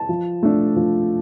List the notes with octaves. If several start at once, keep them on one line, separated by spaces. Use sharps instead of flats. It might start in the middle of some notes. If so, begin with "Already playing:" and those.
Already playing: A5
F3
A3 D4
F3